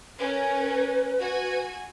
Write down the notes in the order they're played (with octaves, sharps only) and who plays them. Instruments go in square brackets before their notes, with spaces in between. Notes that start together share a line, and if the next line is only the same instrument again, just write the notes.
[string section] C#4 A#4 [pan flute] B4
[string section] F#4 G#5